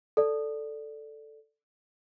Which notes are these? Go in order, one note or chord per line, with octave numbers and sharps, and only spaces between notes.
A4 D5